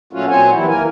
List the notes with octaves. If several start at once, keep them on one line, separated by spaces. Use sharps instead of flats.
A#2 F#3 A3 C#4 F4 F#4
A#2 F#3 C4 C5 C#5 G#5
A#2 E3 F#3 G3 E4
D#2 E3 A#3 A#4 G#5